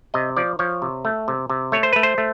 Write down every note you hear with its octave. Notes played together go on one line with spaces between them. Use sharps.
C3 D#5
F3 D5
F3 C#5
C3
A3
C3
C3
A3 C#5
C5
A3 B4
C5
A3